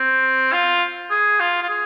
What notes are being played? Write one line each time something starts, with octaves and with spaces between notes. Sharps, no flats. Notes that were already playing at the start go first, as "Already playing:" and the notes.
Already playing: C4
F4
G#4
F4
F4
G#4